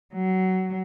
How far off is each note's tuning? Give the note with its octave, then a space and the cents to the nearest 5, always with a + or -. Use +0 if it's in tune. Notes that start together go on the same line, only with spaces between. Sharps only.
F#3 +20